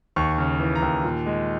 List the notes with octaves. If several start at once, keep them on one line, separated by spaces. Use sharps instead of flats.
D#2 C#6
C#3
E3
A#5
D#2
A#2
G#3